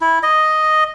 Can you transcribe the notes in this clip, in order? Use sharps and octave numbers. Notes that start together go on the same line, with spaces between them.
E4
D#5